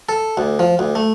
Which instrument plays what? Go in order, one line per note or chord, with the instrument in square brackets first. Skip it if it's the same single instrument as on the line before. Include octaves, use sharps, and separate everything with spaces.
[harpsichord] A4
D2
F3
D2
A3